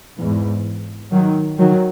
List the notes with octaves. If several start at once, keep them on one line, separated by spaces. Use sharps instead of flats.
E2 G#2
D#3 F#3
D#3 F#3